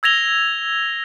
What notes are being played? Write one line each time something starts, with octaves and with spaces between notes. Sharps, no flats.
E6 G#6 A#6 F7 G7